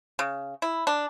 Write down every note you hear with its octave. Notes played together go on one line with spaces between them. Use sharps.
C#3
E4
D4